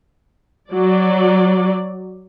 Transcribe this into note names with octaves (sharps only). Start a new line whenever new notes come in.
F#3 D5